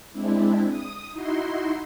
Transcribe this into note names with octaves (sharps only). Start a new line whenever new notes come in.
G#3 C4 D4 E4
D#6
D#4 E4 F#4 C6